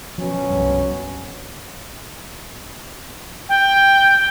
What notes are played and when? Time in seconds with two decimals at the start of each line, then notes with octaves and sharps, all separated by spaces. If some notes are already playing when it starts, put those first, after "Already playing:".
0.18 B2 F3 F#3 C#4
0.50 C2 G2
3.49 G5